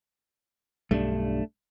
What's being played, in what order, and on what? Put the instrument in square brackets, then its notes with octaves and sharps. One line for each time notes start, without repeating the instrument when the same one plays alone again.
[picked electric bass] B1 G2 [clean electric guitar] A3 D4